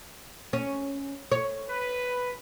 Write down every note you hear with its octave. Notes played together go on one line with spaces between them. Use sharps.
C#4
C#5
B4